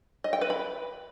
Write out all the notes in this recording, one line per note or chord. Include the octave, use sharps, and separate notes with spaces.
D#5
G5
B4
B5